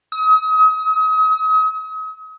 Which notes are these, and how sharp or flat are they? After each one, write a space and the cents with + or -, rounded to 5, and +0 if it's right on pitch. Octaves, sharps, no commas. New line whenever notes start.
D#6 +40